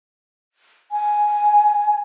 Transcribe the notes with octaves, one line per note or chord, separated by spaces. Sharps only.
G#5